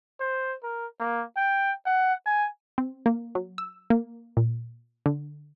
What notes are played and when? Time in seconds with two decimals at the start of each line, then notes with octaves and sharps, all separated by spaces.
0.20 C5
0.63 A#4
1.00 A#3
1.37 G5
1.86 F#5
2.26 G#5
2.78 C4
3.06 A#3
3.35 F#3
3.58 E6
3.90 A#3
4.37 A#2
5.06 D3